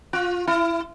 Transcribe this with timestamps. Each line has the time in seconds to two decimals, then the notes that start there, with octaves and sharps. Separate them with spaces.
0.13 F4
0.47 E4